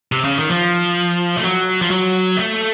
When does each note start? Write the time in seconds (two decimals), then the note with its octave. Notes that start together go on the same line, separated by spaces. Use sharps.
0.12 C3
0.24 C#3
0.38 D#3
0.51 F3
1.36 A3
1.43 F#3
1.81 F3
1.90 F#3
2.37 A3